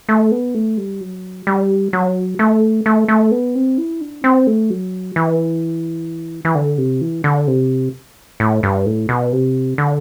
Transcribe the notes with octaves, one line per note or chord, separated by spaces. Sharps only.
A3
B3
A3
G3
F#3
G3
F#3
A3
A3
A3
B3
C4
E4
D4
C4
A3
F#3
E3
E3
D3
C3
E3
D3
C3
A2
G2
A2
B2
C3
D3